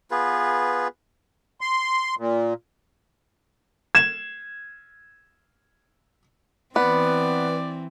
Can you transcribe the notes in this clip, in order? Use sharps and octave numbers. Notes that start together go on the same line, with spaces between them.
B3 F4 G#4 B4
C6
A#2
G#6 E7
E3 B3 C4 B4 D5